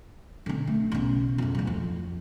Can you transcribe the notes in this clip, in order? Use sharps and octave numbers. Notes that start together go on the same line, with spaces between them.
D3 C4
A3
B1 C#3
F2 C#3
D1 F3
F2